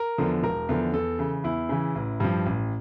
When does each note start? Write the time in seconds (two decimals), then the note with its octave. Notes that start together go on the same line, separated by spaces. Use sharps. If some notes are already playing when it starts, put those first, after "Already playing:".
Already playing: A#4
0.18 E2 D3 F3
0.43 E1 A#4
0.69 E2 D3 F3
0.93 E2 A4
1.19 C#3 E3
1.44 E2 E4
1.69 C#3 E3
1.95 A1
2.20 G2 F3
2.46 A1